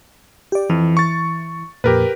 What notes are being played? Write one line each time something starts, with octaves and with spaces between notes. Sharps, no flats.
G4 D5
F2 E3
C#6 A6
F2 A#2 G4 A#4 B4